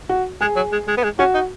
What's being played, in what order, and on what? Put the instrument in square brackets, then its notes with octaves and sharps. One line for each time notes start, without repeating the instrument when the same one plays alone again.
[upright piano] F#4
[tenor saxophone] G#3 [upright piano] G#4
[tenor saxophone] F#3
G#3
G#3
B3
G#3
[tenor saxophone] C#4 [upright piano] F#4
[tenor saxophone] D#4